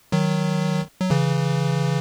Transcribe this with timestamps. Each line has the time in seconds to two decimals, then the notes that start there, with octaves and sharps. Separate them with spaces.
0.12 D#3 F#3
1.00 F#3
1.10 C#3 E3